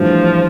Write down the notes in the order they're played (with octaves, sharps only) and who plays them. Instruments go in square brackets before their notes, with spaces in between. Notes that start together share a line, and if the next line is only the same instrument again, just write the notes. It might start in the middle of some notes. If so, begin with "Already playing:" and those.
Already playing: [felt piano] A2 E3 G3 D4 [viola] F3